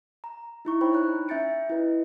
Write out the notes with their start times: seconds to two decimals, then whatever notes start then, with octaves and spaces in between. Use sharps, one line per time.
0.24 A#5
0.65 D#4 E4 C#6
0.81 D4 D#4 C5 C#5 G5 B5
0.93 C#5 A#5 F#6
1.28 C#4 E5 G6 A6 C#7 D7
1.69 E4 B4 D#5